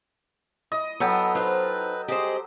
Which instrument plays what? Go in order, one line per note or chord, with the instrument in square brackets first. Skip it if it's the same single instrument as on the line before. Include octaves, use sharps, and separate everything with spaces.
[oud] E4 [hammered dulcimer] D#5
[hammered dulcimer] F#3 A4 G5 [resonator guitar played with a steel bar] B3
[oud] D#4 C5 D#5 [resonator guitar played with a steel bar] F4 [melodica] B4
[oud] G3 C4 [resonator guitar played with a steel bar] G4 C5 [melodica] G#4 D#5